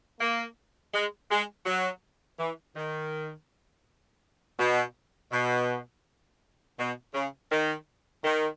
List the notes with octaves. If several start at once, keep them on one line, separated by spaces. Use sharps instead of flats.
A#3
G#3
G#3
F#3
E3
D#3
B2
B2
B2
C#3
D#3
D#3